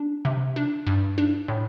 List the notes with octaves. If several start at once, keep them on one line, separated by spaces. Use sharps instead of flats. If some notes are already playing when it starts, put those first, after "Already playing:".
Already playing: D4
C3
D4
G2
D4
A2